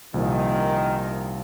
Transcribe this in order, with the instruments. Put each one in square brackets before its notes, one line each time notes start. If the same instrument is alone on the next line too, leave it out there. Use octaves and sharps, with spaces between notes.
[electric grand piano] C2 A#2 F3 [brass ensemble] D#3